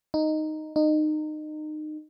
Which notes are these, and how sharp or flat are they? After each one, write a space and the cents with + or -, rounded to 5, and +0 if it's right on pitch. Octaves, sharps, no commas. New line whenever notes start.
D#4 -5
D#4 -25